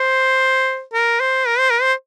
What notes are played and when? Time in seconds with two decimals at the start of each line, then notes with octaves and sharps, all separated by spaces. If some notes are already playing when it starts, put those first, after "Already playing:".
Already playing: C5
0.93 A#4
1.20 C5
1.47 A#4
1.59 C5
1.70 A#4
1.81 C5